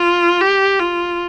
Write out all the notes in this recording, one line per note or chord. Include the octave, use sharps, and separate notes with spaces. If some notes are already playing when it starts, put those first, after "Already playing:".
Already playing: F4
G4
F4